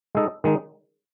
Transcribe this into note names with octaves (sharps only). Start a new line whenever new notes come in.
G#3 D#4 A4 D#5
D#3 G#3 D#4